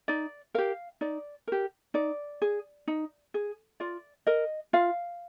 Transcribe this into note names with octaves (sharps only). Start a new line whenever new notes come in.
D#4 D5
G4 A#4 F5
D#4 D5
G4 A#4
D#4 D5
G#4
D#4
G#4
F4 D5
A#4 D#5
F4 F5